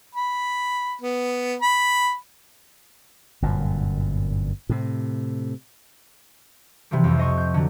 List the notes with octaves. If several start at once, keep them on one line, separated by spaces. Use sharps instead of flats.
B5
B3
B5
G1 F#2 A#2
A2 C3
C3 E3 F3 G3
C2 F2
C5 D#5 C#6
G6
D3 F#3